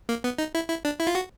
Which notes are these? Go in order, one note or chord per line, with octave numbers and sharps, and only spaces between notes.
A#3
B3
D#4
E4
E4
D4
E4
F4
F#4